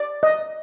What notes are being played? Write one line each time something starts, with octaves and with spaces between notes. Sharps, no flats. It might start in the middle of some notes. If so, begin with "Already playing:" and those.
Already playing: D5
D#5